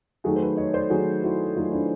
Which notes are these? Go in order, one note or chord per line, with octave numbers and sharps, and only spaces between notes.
D#3 F#3 A3 F#4 G#4
C5
A4 B4
C#5 D#5
C5 D5
D#3 F#3 A3 F#4 G#4
E4 F#4
D#3 F#3 A3 D#4 F4
D4 E4